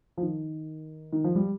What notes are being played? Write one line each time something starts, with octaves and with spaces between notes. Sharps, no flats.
F3
D#3
D#3
F3
G3